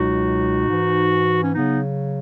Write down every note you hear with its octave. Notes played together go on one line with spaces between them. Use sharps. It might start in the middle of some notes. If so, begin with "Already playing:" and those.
Already playing: C#2 B2 F#3 D#4 F#4
G#2 E3
C#4
C#3 F#3 B3 D#4